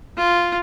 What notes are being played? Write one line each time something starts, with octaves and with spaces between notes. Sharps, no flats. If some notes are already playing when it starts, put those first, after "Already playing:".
F4